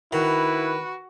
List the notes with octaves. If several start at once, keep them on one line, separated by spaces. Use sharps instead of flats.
D#3 E4 F#4 B4